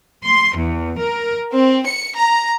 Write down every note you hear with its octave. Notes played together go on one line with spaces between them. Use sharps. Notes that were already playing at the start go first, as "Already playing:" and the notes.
C6
E2
A#4
C4
C#7
A#5